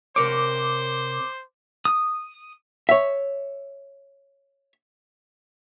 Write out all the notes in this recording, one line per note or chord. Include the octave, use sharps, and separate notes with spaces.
C3 A#4 C5 C#5 D6
D#6
C#5 E5